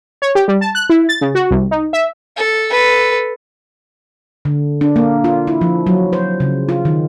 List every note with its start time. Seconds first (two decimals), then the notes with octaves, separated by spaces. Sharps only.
0.22 C#5
0.35 G4
0.48 G3
0.61 A5
0.75 F#6
0.89 E4
1.09 A6
1.21 C#3
1.35 F#4
1.51 C2
1.71 D#4
1.93 E5
2.37 A4
2.70 A4 B4
4.45 D3
4.81 D4
4.96 A#3
5.24 F4
5.47 E4
5.61 F3
5.87 F#3
6.13 C5
6.40 C#3
6.69 F4
6.85 D#3